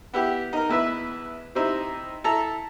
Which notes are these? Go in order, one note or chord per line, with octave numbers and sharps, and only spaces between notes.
B3 E4 G4
D#4 A#4
E2 E4 B4 E5
C3 C4 D#4 E4
E4 A4 A#5